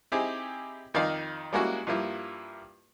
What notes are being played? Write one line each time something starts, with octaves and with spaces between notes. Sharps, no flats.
C4 D#4 E4 G4 G#4
F2 D#3 D#4 D5 F5
G3 G#3 A#3 C#4 E4 F#4
G2 F3 A#3 E4